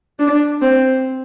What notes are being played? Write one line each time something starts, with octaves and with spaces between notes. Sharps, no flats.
D4
C4